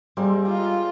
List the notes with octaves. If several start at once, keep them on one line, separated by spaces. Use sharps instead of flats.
G3 G#3 A#3 C4
F4